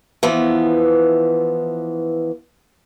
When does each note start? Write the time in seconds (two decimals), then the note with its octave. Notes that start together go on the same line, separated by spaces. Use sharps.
0.23 E3 F3 B3